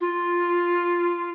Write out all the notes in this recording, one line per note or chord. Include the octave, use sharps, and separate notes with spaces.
F4